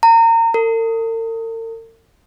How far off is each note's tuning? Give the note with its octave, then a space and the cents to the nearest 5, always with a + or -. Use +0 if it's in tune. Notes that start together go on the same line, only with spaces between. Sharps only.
A#5 -30
A#4 -45